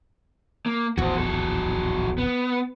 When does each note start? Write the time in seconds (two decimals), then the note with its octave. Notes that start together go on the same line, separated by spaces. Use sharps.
0.66 A#3
0.98 D1 A#1 E2 F#4 C5
1.18 F#3 A4
2.18 B3